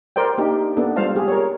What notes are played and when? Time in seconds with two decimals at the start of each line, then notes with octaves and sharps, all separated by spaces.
0.16 A#4 C5 D5 G5
0.38 A#3 D4 D#4 G4
0.77 A#3 B3 D4 A4
0.96 G3 G#3 F4 C5 F5 A5
1.15 G3 G4 G#4
1.28 A#4 C#5